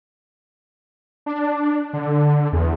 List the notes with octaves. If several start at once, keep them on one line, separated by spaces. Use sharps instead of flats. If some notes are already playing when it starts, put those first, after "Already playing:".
D4
D3
E2